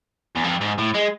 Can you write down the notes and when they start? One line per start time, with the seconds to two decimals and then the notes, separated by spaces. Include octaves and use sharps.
0.36 E2
0.44 F2
0.61 G#2
0.78 A2
0.94 G#3